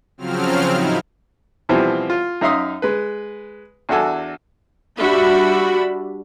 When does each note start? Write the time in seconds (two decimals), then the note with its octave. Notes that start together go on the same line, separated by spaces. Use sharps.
0.18 C#3 F3 F#3 C4 F6
0.68 A2 D#4 E4
1.69 B2 E3 F3 G3 C4
2.10 F4
2.41 F#2 D#4 E5 F5 C6 D#6
2.82 G#3 B4
3.89 E2 D4 F#4 A4 G#5
4.99 G3 D4 F#4 E5 B5